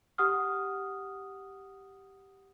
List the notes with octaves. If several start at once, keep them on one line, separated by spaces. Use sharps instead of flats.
G4 F#5 D#6 F6